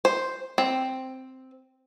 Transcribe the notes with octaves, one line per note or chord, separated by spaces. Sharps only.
C5
C4